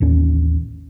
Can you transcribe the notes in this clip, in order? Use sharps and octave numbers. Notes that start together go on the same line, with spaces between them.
A1 D#2 C#4